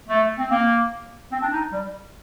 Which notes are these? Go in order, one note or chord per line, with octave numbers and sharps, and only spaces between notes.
A3
C4
A#3
C4
D4
D#4
G3